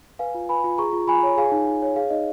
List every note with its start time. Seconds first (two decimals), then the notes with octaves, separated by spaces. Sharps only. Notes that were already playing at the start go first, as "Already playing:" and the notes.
0.19 B4 F5 G#5
0.35 F4
0.49 B4 G#5 B5
0.64 F4
0.78 G#4 A#5 C#6
0.93 F4
1.08 F4 G#5 B5
1.23 C#5
1.37 G#4 F5 G#5
1.52 D#4
1.67 D#4
1.82 C#5
1.96 G#4 F5
2.10 D#4 D#5